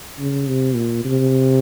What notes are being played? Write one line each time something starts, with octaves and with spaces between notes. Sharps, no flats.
C#3
C3
A#2
C3